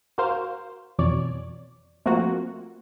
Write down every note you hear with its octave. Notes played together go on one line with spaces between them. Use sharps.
F#4 A#4 C5 F5
F2 B2 E3 C#5 D5
F3 A3 A#3 C4 F4 F#4